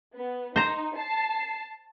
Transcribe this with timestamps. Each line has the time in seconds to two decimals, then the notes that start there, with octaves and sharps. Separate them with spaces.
0.14 B3
0.56 D#4 C5 A#5
0.96 A5 C7